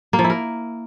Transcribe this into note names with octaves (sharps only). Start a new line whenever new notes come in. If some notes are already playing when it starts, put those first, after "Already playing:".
A#3
F3
E4
A#4